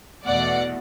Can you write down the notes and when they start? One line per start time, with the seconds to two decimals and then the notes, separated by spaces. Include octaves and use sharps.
0.25 E2 B2 A3 D5 F#5